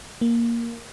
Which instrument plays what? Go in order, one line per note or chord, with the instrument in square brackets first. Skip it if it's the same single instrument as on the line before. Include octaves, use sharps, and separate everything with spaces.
[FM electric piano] A#3